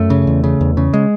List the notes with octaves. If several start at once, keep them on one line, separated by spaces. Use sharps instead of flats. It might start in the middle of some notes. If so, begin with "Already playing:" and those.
Already playing: F#2 A3
C#3
E2
C#3
E2
C#3
G#3